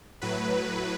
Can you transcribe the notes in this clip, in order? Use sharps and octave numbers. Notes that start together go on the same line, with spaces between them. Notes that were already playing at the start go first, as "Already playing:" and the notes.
A2 F#3 B4